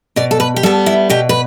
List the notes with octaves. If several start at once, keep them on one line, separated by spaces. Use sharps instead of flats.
B2 D5
A4
B4
G4
G3 B3 A4
E4
B2 G4
B4